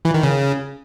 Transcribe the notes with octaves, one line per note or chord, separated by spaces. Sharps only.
E3
D#3
C#3